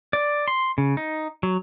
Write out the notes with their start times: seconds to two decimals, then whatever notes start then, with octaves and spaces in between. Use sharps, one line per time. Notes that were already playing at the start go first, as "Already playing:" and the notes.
0.13 D5
0.48 C6
0.78 C#3
0.97 D#4
1.43 F#3